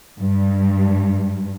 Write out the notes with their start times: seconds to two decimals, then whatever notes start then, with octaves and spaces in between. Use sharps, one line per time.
0.20 G2